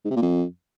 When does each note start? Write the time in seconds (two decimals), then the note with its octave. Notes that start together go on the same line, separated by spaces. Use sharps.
0.05 G#2
0.10 C3
0.16 A#2
0.22 F2